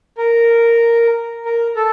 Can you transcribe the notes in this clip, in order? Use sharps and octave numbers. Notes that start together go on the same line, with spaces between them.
A#4
A#4
A4